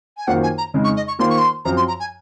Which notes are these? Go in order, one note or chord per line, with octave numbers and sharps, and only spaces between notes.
G#5
F#2 D#3 A#3 F4 C5 F#5
G#5
A#5
F2 C#3 G#3 D#4
C#6
D#5
C#6
D#3 A#3 F4 C5 C6
C#6
C6
F#2 F3 C4 A#5
C6
A#5
G#5